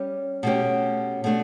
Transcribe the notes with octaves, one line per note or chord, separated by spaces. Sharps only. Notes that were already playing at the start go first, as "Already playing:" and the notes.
Already playing: G3 C#4 G4
B2 A3 C#4 G4
B2 A3 D4